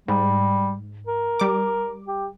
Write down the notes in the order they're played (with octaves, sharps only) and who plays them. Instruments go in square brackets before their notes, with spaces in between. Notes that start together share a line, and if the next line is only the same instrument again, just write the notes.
[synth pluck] G#2 [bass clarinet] G3
[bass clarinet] A#4
[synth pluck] G3 D6
[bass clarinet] G4